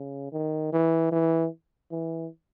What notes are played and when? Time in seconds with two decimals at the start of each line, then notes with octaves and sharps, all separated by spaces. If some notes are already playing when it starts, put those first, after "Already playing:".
Already playing: C#3
0.32 D#3
0.72 E3
1.12 E3
1.91 E3